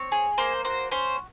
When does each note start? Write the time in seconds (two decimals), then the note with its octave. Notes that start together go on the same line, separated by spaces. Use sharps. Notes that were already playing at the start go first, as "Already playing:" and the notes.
Already playing: C4 C#5
0.12 G#4
0.38 A#3 C5
0.65 F#4 C5
0.91 C#4 C5